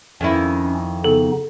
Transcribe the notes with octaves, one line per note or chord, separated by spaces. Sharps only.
F2 D#3 C#4 E4
C#3 B3 D#4 A4